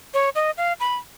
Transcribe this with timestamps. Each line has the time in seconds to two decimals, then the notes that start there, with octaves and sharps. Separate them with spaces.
0.14 C#5
0.35 D#5
0.58 F5
0.80 B5